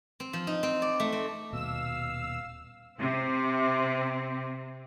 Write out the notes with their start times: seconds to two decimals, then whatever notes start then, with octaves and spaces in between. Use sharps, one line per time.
0.20 C4
0.33 F3
0.47 D#4
0.63 C4
0.82 D5
1.00 A3
1.12 C4
1.53 D#1 B2 F5 E6
2.98 C3 C4